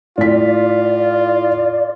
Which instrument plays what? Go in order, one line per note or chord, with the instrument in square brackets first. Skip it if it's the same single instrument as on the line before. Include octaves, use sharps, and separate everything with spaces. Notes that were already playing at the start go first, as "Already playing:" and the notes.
[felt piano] A2 B6 [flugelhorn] F4 [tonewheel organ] D5